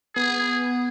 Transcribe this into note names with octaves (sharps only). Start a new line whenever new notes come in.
B3 G#4